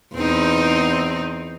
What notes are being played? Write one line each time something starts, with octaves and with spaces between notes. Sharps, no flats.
E2 C4 D#4